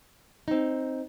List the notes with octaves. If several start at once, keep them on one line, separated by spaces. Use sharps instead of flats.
C4 D#4